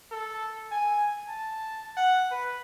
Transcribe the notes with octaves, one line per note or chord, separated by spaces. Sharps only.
A4
G#5
A5
F#5
B4